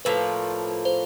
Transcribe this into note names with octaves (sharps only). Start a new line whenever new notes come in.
A2 F3 A#3 B4
C5